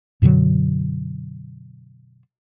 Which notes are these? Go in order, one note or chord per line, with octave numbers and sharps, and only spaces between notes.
F#2 B2 D3 F#3